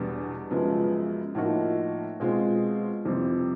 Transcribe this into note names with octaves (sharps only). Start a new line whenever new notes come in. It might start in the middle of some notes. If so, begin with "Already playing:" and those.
Already playing: E2 B2 G3 B3 D4
F#2 C#3 F3 G#3 B3
A2 F3 A#3 D#4 F#4
B2 G#3 C4 F4
F2 C3 E3 G3 C4